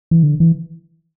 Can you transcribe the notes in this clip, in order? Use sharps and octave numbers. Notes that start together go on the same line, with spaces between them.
E3
D3
E3